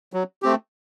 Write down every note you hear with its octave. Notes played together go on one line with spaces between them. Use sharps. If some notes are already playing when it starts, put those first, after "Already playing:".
F#3
A3 C4 G4